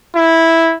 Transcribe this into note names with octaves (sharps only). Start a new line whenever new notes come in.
E4